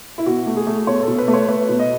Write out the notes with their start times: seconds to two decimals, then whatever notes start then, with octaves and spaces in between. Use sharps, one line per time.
0.18 E4
0.26 B2 F#4
0.46 A3
0.56 G#4
0.67 A3
0.87 B2 C#5
1.03 B2 A4
1.18 B4
1.28 A3
1.33 C#5
1.48 A3 B4
1.69 B2
1.79 D#5